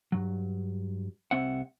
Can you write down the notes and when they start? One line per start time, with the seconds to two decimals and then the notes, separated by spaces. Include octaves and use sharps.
0.12 G2 F#3
1.31 C2 C4 E5 F#5